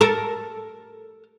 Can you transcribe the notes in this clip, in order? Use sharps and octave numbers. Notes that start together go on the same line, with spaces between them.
A4 A#4